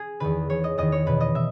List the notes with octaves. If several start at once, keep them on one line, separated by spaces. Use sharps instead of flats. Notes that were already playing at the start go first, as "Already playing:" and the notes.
Already playing: G#4
E2 D#3 B4
E2 D#3 C#5
D#5
E2 D#3 D#5
C#5
E2 B2 B4
D#5
B2 E5